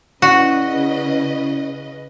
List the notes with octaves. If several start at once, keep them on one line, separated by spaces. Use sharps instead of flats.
C#3 C#4 E4 F#4 B4 D5 D#5